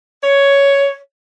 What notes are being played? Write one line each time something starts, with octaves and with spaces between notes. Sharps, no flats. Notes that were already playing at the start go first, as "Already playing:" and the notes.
C#5